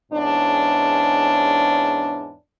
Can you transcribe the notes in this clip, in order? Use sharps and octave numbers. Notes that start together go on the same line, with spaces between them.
E2 G#2 C#4 D4